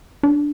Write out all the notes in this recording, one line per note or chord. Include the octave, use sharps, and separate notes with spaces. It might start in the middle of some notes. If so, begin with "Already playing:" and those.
D4